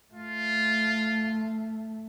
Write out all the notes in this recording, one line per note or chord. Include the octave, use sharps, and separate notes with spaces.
A3 F4